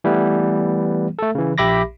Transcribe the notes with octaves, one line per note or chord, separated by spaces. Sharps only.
E3 G3 A3 B3
A3 A4
C#3 E3
A#1 G4 E5 B5 D6 A#6